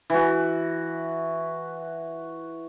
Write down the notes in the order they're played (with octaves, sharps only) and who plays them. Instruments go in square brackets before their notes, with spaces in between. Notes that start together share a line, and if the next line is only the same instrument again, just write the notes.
[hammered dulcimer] E3 F#4